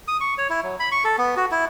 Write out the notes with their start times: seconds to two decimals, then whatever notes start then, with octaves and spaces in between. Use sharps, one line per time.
0.08 D#6
0.21 C#6
0.38 C#5
0.50 E4
0.63 F#3
0.80 B5
0.92 C#6
1.04 A4
1.18 B3
1.36 F#4
1.51 E4